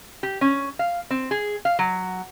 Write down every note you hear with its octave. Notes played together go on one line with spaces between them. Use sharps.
G4
C#4
F5
C4
G#4
F5
F#3